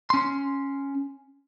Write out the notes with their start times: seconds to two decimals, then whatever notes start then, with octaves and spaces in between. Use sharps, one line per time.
0.10 C#4 C6